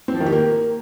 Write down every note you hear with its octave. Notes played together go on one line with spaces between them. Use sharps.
C4
F3
D#3
G4
A#3